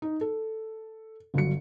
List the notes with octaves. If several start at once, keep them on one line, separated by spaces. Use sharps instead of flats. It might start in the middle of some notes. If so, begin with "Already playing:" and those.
D#4
A4
G1 D3 F#3 C#7